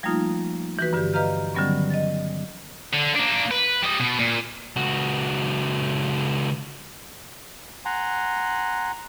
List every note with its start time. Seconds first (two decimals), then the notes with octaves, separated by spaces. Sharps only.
0.03 F3 G3 A3 A#3 D#4 F4
0.79 E3 F#4 B4
0.93 G2 D3 G4
1.13 B4 D#5 F5 A#5 F6 G6
1.55 D3 D#3 F#3 G3 B3 C#4
1.90 D#5 A6
2.93 D3
3.15 A#3 D4
3.51 B4
3.84 G3 D#5
4.00 B2
4.19 A#2
4.76 C#2 F#4
7.85 F#5 G#5 A#5 C6